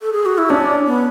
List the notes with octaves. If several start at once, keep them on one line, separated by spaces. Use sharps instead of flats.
A4
G#4
F#4
E4
C#4 D4
B3